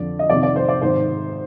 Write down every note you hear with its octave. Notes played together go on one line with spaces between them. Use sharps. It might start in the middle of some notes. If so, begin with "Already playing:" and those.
Already playing: F2 D3 D5
D#5
F2 C3 D#3 D5
D5
C5
D5
G#2 D#3 C5